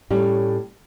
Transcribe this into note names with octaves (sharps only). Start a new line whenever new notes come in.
A2 G3 C#4